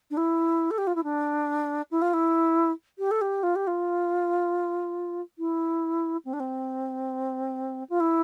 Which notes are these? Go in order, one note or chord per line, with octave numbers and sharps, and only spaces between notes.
D4
E4
A4
G4
F4
E4
D4
E4
F4
E4
G4
A4
G4
F4
G4
F4
E4
C4
D4
C4
F4
E4